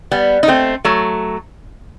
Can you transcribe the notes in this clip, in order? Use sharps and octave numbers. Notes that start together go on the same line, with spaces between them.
G3 B3
D#4
A3 C4
F#3 A3